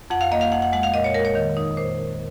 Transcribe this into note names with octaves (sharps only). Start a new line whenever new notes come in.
F2 F#5
F5
A#3 D#5
F5
F2 F#5
F#5
G#3 F#5
F5
A#2 D#5
C#5
G#3 A#4
C#5
D#3
D#4
A#2 C5